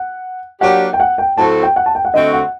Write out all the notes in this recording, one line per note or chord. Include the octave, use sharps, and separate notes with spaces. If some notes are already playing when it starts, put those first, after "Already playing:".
Already playing: F#5
F#3 A#3 D4 G4 F#5
G5
F#5
G5
A2 F#3 A3 C4 F#4 A5
G5
F#5
A5
G5
F#5
D3 A3 C4 F#4 D#5
F#5